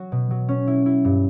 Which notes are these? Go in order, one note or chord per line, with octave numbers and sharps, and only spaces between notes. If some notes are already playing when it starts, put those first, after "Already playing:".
Already playing: F#3 F#4
B2
F#3
C#4
E4
E4
G2